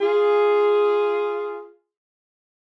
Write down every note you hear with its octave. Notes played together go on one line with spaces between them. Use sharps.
F4 G#4